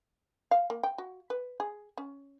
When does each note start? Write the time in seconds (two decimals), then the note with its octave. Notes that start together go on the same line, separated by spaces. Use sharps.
0.51 F5
0.70 A#3
0.83 G5
0.98 F#4
1.30 B4
1.60 G#4
1.97 C#4